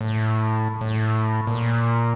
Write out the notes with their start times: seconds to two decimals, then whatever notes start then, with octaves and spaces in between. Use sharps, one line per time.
0.01 A2
0.81 A2
1.47 A#2